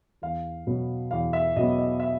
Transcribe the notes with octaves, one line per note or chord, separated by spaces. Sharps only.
E2 F5
B2 F#3 B3
E2 F5
E5
B2 F#3 B3 D#5
D#5
E5